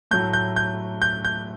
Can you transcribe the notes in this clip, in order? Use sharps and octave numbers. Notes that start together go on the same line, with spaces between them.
A2 F#3 A3 G6
G6
G6
G6
G6